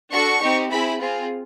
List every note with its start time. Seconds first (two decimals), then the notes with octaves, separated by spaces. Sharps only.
0.11 D4 F#4 A4 C#6
0.41 C4 D#4 G4
0.70 C4 E4 G#4 B5
0.99 C4 F4 G#4